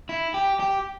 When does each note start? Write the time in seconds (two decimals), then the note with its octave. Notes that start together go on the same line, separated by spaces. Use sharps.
0.09 E4
0.34 G4
0.60 G4